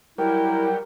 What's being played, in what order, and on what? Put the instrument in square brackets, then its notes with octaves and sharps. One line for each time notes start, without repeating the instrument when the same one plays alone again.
[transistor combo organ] F#3 G3 [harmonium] E4 [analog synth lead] A#4 [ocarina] G5